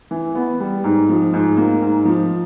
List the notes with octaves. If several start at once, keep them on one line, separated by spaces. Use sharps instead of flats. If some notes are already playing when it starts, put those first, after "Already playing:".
E3
B3
G3
G#2
F3
G#2
A#3
G#2
F3